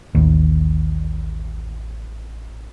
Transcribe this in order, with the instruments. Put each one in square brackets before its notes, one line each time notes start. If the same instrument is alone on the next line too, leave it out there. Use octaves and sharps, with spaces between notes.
[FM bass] A1 [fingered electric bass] D#2